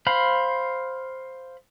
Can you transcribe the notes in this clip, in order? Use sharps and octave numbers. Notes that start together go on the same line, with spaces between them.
C5 F5 B5